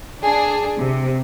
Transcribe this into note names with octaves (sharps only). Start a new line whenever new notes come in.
D4 G#4
C3